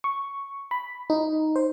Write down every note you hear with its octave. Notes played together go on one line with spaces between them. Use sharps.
C#6
B5
D#4
C5